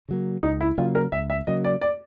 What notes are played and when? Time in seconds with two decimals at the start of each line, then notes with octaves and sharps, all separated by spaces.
0.09 C#3 F#3 A#3
0.43 C#2 D#4
0.61 E4
0.78 C#3 F#3 A#3 F4
0.95 A#4
1.12 C#2 E5
1.30 E5
1.47 C#3 F#3 A#3 D#5
1.64 D5
1.81 D5